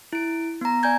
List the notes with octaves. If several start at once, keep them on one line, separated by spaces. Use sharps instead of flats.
E4 D7
B3 A#5
D5 G#5 A#5 G6 G#6